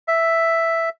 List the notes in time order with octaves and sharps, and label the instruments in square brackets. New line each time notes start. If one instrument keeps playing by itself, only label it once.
[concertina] E5